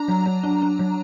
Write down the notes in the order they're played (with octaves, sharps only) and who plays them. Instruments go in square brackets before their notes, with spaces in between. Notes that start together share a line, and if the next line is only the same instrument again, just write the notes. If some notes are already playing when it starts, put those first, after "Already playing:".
Already playing: [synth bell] D4 A#5
F#3
F#3
D4
D4
F#3